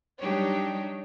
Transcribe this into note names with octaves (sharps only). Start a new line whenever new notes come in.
F#3 G3 D4 D#4 G4 C#5